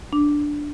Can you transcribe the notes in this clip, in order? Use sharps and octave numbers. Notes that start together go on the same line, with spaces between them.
D4